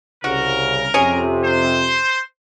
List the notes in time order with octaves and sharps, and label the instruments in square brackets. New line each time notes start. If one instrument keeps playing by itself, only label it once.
[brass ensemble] C2 C#3 [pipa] F#4 [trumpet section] A#4
[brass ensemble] F2 C3 [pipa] C#4 G#4
[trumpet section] C5